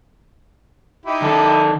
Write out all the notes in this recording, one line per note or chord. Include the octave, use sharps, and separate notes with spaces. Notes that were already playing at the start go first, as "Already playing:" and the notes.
D#4 E4 G4
D#3 A4